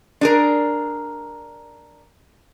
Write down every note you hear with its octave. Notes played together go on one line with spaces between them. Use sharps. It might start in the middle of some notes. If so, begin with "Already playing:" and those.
D4 G#4 A#4